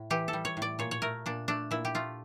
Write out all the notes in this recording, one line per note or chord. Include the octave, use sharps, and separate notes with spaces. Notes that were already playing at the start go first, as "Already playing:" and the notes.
Already playing: A2
E3 G4
A4
G3
C#5
A2
D5
A#2 C#5
C#5
A3 A#4
A#2 D4
A3 D4
A#2 E4
G4
A3 F4